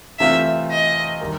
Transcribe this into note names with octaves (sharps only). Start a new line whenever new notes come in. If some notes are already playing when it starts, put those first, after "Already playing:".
C3 E3 A3 C4 F4 E5
D#5
D#3 G3